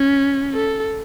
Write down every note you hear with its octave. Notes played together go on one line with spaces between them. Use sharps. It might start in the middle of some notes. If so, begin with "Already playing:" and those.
Already playing: C#4
A4